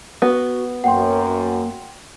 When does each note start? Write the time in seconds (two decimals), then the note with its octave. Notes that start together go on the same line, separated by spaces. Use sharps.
0.22 B3 F#4
0.84 F#2 A#3 F#5 G5 C6